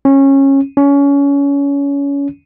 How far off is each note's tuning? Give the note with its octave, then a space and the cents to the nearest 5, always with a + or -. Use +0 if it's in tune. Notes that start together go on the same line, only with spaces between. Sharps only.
C#4 -20
C#4 +25